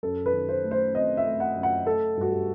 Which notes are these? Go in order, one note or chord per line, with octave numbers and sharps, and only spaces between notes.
F#2 A4
B4
D#3
C5
A3
C5
C4 D#5
E5
A3
F#5
F#2
F#5
A3 A4
G2 F#4
G4